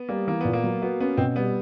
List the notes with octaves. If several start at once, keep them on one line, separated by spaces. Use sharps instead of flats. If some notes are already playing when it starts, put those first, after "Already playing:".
Already playing: B3
G3 A#3
E3 A#3
A#2 B3
A#3
F#3
B3 F#4
B3 C#4
B2 C4
G3 B3